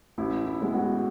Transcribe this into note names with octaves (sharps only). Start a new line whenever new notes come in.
A1 E4
E4
A2 G#3 B3
F#4